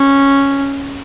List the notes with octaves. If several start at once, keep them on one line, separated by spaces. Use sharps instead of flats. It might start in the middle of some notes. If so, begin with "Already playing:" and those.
Already playing: C#4